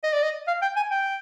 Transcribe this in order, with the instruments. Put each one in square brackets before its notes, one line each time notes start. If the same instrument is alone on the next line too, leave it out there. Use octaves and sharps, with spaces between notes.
[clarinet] D#5
D5
D#5
F5
G5
G#5
G5